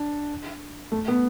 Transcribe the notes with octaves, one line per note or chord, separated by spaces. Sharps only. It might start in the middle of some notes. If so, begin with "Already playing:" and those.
Already playing: D4
A3
B3